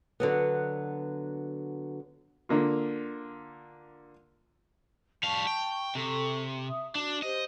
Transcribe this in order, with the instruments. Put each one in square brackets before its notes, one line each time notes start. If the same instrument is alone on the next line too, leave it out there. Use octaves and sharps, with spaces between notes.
[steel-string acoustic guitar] D3 F#3 B3
[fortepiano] D3 A#3 F4
[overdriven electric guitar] G3 F5 [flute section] A5 C#6
[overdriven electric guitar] G5
[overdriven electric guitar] C3 [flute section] A4 C#6
[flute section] E5 D#6
[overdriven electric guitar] D4 [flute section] F#4
[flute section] G4 C5 [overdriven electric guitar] D#5